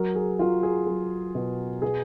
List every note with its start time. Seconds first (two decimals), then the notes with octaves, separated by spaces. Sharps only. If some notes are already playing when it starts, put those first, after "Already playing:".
Already playing: F#3 A#4
0.16 G#4
0.39 F#3 F4
0.63 G#4
0.87 F#3
1.35 B2
1.82 B2 G#4